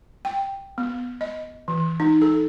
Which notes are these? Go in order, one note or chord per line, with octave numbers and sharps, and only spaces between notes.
G5
B3
D#5
E3
D#4
A4